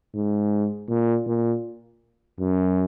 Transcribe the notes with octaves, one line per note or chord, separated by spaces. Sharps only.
G#2
A#2
A#2
F#2